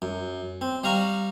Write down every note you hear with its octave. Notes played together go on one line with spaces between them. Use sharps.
F#2
C4
G3 F5 A#5 C#6